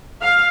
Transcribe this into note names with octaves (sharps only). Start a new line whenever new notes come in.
F5